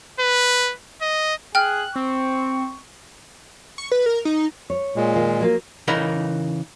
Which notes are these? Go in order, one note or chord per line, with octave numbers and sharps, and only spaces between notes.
B4
D#5
G#4 G5 F6 F#6
C4 C#6
C#6
B4
A#4
D#4
C#5
A#2 G#3
D#3 F4
F#3 A#3 F4
C#3 E3 D#4 A#4 B5